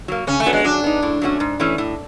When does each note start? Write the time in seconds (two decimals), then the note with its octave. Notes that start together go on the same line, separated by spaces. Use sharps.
0.08 F#3 A#3
0.27 C#3 C#4
0.40 A3
0.46 F#3 B3 D4
0.53 G#3
0.64 F#3 D4
0.84 B3 D#4
1.03 A2
1.22 F#3 A3 C#4 F#4
1.40 G#2
1.60 E3 A3 C#4
1.78 A2